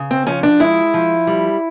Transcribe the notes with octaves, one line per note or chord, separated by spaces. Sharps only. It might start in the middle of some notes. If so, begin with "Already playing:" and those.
Already playing: C#3
C4
F3 C#4
D4
G#3 E4
F3
G3